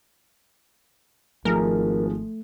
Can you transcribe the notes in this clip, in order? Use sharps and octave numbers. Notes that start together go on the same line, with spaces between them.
G#1 F3 G#3 A3 A#4